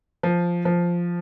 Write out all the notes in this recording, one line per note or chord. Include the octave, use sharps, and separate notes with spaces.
F3
F3